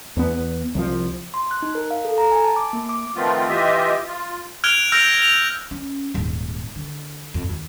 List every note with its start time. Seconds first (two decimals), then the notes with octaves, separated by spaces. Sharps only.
0.17 E2 B3
0.75 C2 F3
1.34 C6
1.51 F#6
1.62 D#4
1.75 A#4
1.91 F5
2.05 A4
2.18 A#5
2.32 G#5
2.44 A5
2.56 D6
2.73 A#3
2.89 D6
3.15 D#3 F3 A3 B3 C4 F4
3.49 E3 F4 G4 D#5 E5
4.06 F4
4.64 F6 F#6 G#6 D7 F7 G7
4.92 E6 F6 G6 A#6 D7 F7
5.22 F7
5.71 C#4
6.14 D#1 G#2
6.76 D3
7.34 F2
7.50 D#2